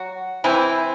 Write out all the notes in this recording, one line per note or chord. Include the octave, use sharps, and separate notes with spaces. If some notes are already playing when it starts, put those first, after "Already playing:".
Already playing: F#3 F#4
C3 E3 C4 E4